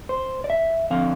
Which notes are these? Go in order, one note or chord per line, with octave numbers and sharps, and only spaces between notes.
C5
D5
E5
D3 F3 C4 F5